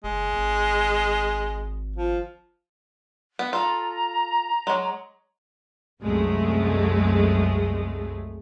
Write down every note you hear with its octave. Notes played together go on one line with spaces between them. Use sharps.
F#1 G#3
G#1
F3
B3
F4 A4 A#5
F#3 G#3
C2 F#2 G#3 A3